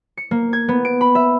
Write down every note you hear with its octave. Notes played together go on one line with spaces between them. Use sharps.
C#7
A#3
G#6
B3
D7
B5
E5